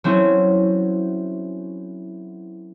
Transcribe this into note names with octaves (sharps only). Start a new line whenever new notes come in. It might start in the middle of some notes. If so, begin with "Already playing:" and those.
F#3 A3 C4 C#4 E4 F#4